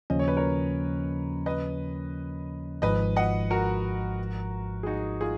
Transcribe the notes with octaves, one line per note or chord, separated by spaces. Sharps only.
D#2 C#3 F3 A#3 C#4 D#5
C#5
B4
A#4 C#5
B4 D#5
G#1 G#2 F3 B4 D#5
D#5 F#5
F#4 A#4
G#4
D#4 F#4
F4 G#4